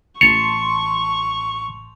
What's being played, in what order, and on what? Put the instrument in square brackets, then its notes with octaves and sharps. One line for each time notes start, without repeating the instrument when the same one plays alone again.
[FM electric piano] A1 A5 C6 [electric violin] C#6 [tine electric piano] C#7 [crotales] F7